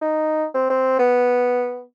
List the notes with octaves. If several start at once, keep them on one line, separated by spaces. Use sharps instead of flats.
D#4
C4
C4
B3